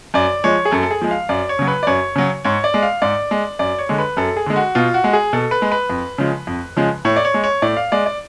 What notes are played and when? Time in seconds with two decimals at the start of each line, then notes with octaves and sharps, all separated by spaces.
0.14 F#2 D5
0.44 F3 G#3 C#5
0.65 G#4
0.71 F#2 A4
0.83 A4
0.91 G#4
1.01 F3 G#3
1.11 F5
1.29 F#2 D5
1.49 C#5
1.59 C#3 F#3
1.67 B4
1.83 D5
1.87 F#2 C#5
2.16 C#3 F#3
2.45 G#2 C#5
2.64 D5
2.74 G#3
2.83 F5
3.02 G#2 D5
3.31 G#3
3.59 F#2 D5
3.79 C#5
3.89 D3 G#3
3.98 B4
4.17 F#2 A4
4.37 G#4
4.46 D3 G#3
4.56 F#4
4.75 B2 F4
4.94 F#4
5.04 G#3
5.13 G#4
5.33 B2 A4
5.51 B4
5.62 G#3
5.72 B4
5.90 F2
6.18 C#3 F3 G#3
6.47 F2
6.77 C#3 F3 G#3
7.05 A2 C#5
7.16 D5
7.25 C#5
7.34 G#3
7.44 C#5
7.62 A2 D5
7.77 F5
7.92 G#3 D5
8.06 D5